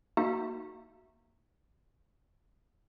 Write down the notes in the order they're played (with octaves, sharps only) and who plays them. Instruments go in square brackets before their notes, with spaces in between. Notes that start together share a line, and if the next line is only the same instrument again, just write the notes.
[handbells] A#3 D#4 F#4 E5